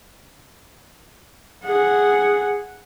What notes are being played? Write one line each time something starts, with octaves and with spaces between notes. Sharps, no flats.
G#4 F#5